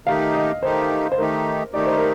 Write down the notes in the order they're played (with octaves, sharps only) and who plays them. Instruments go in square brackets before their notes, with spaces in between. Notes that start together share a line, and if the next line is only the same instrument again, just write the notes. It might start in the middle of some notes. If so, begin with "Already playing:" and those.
[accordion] D#3 A3 D#4 G4 [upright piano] F5
[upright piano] D#5
[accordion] D#3 A3 D#4 G4 [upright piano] C5
[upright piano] C5
[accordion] D#3 A3 D#4 G4 [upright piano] A#4
[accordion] D#3 A3 D#4 G4 [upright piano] D5
[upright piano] C5
A#4